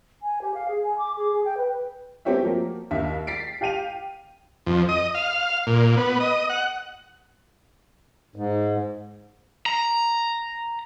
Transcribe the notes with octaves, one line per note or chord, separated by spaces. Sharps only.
G#5
G4
F5
G#4
G#5
D6
G#4
G#4
G5
B4
F#3 B3 C4 G4 C#5 E5
F3 F#3 A#3
D#2 E5 F5
A6 B6 C7 D7
G4 F5 G5 D#7 F7
F2
D#5
F5
A#2
B3
D#5
F#5
G#2
A#5